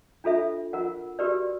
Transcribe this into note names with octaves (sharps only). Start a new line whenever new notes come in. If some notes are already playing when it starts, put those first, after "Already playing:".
D4 F4 A4 E5
F4 A#4 F#5
F#4 G4 A#4 B4 D5